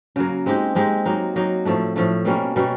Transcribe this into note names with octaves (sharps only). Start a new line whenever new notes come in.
C#3 F#3 A#3
G#3 C4 D#4 G4
G#3 C4 D#4 G4
F#3 A#3 D#4
F#3 A#3 D#4
A2 F3 A3 D4
A2 F3 A3 D4
B2 G3 A#3 C#4
B2 G3 A#3 C#4